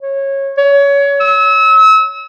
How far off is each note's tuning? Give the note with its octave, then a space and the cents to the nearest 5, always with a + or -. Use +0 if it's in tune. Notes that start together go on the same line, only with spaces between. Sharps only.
C#5 -20
C#5 +25
E6 -35